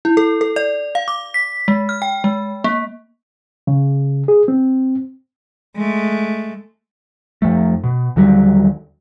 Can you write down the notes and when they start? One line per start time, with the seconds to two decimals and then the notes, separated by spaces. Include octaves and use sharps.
0.05 E4
0.17 A4
0.41 A4
0.56 D5
0.95 F5
1.08 D6
1.34 B6
1.68 G#3
1.89 F6
2.02 G5
2.24 G#3
2.64 A#3
3.67 C#3
4.28 G#4
4.48 C4
5.76 G#3 A3
7.42 F2 F3 A3
7.84 B2
8.16 D#2 D3 F#3 G3